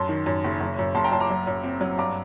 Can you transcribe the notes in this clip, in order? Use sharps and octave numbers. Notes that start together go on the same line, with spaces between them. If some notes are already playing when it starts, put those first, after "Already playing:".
Already playing: F#2 A5 C6
D#3
F#2
F#1
F#1
F#2
F#1 A5 C6
G5 A#5
F#2 A5 C6
A#5 D6
F#3
F#2
C4
F#3
G2 A#5 D6